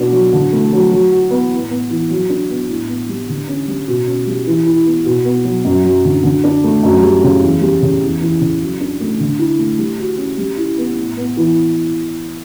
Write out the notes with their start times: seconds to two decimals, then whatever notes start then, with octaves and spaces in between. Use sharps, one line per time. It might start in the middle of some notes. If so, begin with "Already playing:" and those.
Already playing: B2 B3 D4
0.12 F#3
0.33 D3
0.53 A3
0.72 F#3
0.91 F#3
1.12 F#4
1.31 B3
1.50 A2
1.70 B3
1.90 E3
2.10 F#3
2.29 D4
2.50 B3
2.68 A2
2.89 B3
3.09 G3
3.29 D3
3.48 C#4
3.68 G3
3.87 B2
4.07 C#4
4.27 G3
4.47 E3
4.66 E4
4.86 B3
5.06 B2
5.25 B3
5.45 F#3
5.65 F#2
5.84 F#3
6.04 D3
6.23 D3
6.44 D4
6.64 A3
6.83 F#2
7.02 G3
7.23 C#3
7.42 E2
7.61 G3
7.81 C#3
8.02 E2
8.21 E3
8.40 C#3
8.60 F#3
8.80 D4
9.00 A3
9.19 D3
9.39 E4
9.59 A3
9.78 G3
9.99 F#4
10.17 C#4
10.38 G3
10.57 E4
10.78 B3
10.97 A2
11.17 B3
11.37 E3